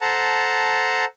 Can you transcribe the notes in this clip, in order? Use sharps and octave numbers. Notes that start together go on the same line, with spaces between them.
A4 C5 F#5 A5 A#5